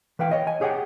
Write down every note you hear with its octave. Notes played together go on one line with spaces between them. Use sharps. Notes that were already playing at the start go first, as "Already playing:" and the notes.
E3 B4 F5 G5
C#5 D#5
G#5
G4 G#4 C#5 F#5 G5